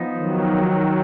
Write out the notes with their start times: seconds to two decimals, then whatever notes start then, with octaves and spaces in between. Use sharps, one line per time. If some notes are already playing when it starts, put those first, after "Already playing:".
Already playing: F3 B3 D#4
0.16 D#3 F#3